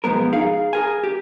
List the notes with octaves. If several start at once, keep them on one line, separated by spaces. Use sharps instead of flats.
B1 F3 G#3 B3 A#4
D#4 G#4 F5
G#4 A#4 G#5
G4